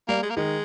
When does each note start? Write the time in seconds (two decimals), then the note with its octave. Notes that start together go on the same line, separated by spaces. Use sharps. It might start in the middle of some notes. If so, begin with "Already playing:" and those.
0.08 G3 A#3
0.23 G#3
0.30 A#3
0.36 D#3 G#3